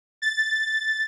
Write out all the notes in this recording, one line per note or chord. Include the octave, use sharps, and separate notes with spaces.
A6